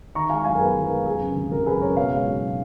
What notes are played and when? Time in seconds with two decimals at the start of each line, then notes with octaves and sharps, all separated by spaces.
0.15 D#3 A#5 C#6
0.30 G#3 F5 G#5
0.45 F#2 F5 G#5
0.55 A#4
0.60 B3 G#4 B4
0.76 D#3
0.83 A#4
0.91 G#3
1.06 F#2 G#4
1.21 C#3
1.36 G#1
1.51 G#1 A#4
1.66 F#2 G#4 B4
1.81 C#3 A#4 C#5
1.97 B2 C#5 F5
2.13 G#3
2.27 B1